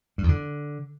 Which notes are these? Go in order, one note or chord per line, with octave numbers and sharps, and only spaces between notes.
G2
E2
D3